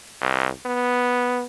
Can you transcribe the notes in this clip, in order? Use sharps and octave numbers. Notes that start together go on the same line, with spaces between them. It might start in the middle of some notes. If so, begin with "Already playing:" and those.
C2
B3